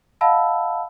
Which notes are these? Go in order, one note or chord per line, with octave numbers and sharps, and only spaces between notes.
D#5 F5 F#5 A5 B5 E6